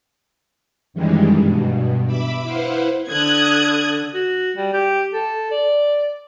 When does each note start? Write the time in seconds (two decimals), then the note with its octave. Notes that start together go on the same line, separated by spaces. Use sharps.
0.94 F#2 D#3 E3 G3 G#3
1.36 G2 B2
2.07 E5 B5 D6 E6
2.43 E4 B4 C5 F5 F#5
3.10 D3 D#6 F#6 G#6
4.14 F#4
4.56 G3
4.73 G4
5.13 A4
5.51 D5